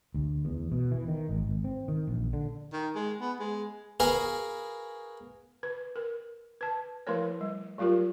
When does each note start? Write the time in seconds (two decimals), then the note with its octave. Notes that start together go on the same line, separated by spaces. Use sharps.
0.14 D2
0.45 E2
0.72 B2
0.91 E3
1.08 D#3
1.29 G#1
1.48 G#1
1.64 C4
1.88 D#3
2.07 A#1
2.33 D3
2.73 D#3
2.95 G#3
3.21 B3
3.40 G#3
4.00 F#4 G#4 A#4 B4 F5 G#5
5.63 B4
5.96 A#4
6.61 B4 A5
7.07 F3 A3 E4 A#4 B4 C#5
7.41 G3
7.78 F#3 A3 F4 G4 A#4